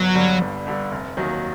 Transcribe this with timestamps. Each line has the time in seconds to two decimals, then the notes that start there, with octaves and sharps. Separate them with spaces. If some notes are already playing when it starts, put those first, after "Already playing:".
Already playing: G1 F#3
0.15 G2 D3 G3
0.41 G1
0.67 G2 D3 G3
0.91 F1
1.17 D#2 D#3 F#3 A#3